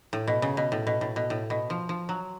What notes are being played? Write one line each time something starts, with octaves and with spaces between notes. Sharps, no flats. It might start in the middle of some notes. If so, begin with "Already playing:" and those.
A2
B2
C#3
B2
A2
B2
A2
B2
A2
B2
F3
F3
F#3